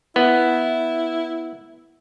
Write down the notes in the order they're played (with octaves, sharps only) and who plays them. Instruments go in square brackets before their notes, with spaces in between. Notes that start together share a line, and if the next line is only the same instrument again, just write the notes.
[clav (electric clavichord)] B3 [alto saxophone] E4